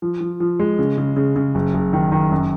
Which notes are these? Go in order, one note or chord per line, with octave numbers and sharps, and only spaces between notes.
F3
F3
F3
G#3
C#3
C#3
C#3
C#3
F#1
F#1
D#3
D#3
F#2